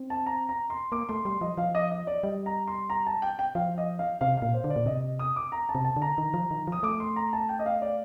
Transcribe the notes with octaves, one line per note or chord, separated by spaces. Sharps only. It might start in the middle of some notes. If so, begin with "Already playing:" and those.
Already playing: C4
A5
A#5
A#5
C6
A#3 D6
A3 C6
G3 C6
F3 D#5
F3 F5
D#5
D#5
D5
G3 D#5
A#5
C6
A#5
A5
G5
G5
F3 F5
D#5
F5
C3 F5
A#2 F5
C5
D3
D5
A#2
C3 D#5
D#6
D6
A#5
A5
C3
A5
D3
A#5
D#3
F3
D#3
F3 D#6
A3 D6
C6
A#5
A5
G5
D#5
F5
D5